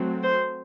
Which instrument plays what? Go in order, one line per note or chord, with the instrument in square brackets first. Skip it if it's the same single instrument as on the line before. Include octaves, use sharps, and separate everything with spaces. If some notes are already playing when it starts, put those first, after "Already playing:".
Already playing: [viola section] F#3 A3 C4
C5